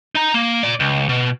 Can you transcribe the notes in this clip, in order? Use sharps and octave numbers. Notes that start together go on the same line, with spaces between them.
D#4 A#5
A#3
A#2 D5
C#2
B2